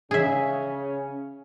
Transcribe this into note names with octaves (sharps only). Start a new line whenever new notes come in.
C#3 C#4 G#4 E5